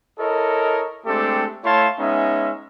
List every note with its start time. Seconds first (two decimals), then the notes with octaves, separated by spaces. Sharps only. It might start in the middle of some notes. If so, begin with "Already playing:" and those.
0.19 E4 A4 A#4 C#5 D#5
1.06 G#3 A3 C4 D4 G4 A4
1.64 A3 E4 C#5 F5 A5 C6
1.98 G#3 B3 C#4 D#4 D#5 E5